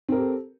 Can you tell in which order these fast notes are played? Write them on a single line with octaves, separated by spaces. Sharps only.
C4 A#4 G4 A4